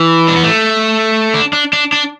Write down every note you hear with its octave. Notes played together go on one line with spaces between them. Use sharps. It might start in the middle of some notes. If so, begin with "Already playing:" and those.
Already playing: E3
D4
B3
A3
D4
D4
D4
D4